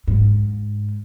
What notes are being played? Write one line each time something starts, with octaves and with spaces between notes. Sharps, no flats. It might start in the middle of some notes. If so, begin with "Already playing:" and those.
G#2